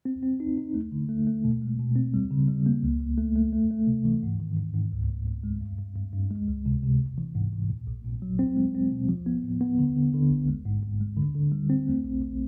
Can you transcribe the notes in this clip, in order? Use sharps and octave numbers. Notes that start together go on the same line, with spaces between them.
C4
C4
D#4
D#4
A3
D3
A3
A3
B2
G#3
B2
C4
G3
C#3
G3
A#3
C#2
C#2
A3
A3
A3
A3
C3
E3
G#2
D#3
G#2
G#2
C#2
C#2
C#2
G#3
G2
G2
G2
G2
G#3
C#2
C3
C3
A1
E3
G#2
E3
A#2
A#1
A#2
F#3
C4
G#3
C4
B2
F3
B3
A2
B3
D3
D3
D3
A1
G#3
G#2
G#2
G#3
D3
D3
G3
C4
A3
A#1
A#1